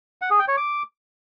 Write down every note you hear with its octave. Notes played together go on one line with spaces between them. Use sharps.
F#5
G#4
G5
C#5
D6